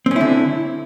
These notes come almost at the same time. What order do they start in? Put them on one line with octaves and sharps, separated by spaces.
C4 C#4 E4 D3